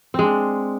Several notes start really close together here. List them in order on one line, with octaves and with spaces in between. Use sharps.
C4 G#3 D4